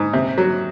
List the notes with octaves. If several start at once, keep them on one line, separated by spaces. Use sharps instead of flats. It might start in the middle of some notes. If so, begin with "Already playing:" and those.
Already playing: G#2
C3
F#3